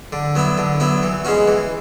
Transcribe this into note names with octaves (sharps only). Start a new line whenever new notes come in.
D3
F#3 B3 E4
D3
F#3 B3 E4
E3
G#3 C#4 F#4
E3